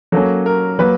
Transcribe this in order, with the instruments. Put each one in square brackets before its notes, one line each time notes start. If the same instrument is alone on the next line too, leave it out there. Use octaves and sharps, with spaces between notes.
[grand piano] F#3 A#3 C#4 [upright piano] A4
[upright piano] A#4
[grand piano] F#3 A#3 [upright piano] B4